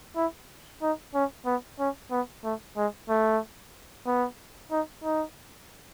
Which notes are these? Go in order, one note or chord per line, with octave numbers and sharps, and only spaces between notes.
E4
D#4
C#4
B3
C#4
B3
A3
G#3
A3
B3
D#4
D#4